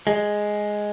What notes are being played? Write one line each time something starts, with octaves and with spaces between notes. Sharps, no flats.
G#3